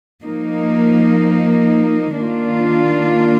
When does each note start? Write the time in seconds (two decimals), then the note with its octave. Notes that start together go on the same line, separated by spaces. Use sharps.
0.22 F3 A#3 D#4
2.18 D#3 A#3 D4 F4